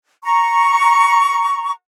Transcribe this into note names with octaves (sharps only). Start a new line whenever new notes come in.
A#5 C#6